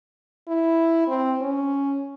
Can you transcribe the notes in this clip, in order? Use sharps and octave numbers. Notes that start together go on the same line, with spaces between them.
E4
C4
C#4